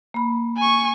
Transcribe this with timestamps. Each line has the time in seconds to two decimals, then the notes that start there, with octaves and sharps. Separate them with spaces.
0.14 A#3 B5
0.57 G#5 C#6